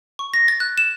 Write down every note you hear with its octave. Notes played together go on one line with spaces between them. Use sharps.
C#6
A#6
A6
F#6
E7